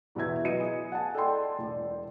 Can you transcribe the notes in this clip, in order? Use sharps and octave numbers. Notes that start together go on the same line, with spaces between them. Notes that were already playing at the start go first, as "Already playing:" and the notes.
E2 B2 E3 E5 G#6
F#3 B3 D#5 C#7 D#7
G#4
F#5 G#5 A5
A4 D5 D#5 G5 C6
E1 D5